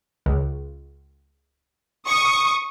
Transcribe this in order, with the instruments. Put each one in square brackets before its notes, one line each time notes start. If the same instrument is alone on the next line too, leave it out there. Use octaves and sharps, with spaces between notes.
[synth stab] C#2
[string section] C#6 D#6